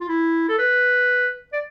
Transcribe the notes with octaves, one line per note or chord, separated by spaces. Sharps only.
F4
E4
A4
B4
D5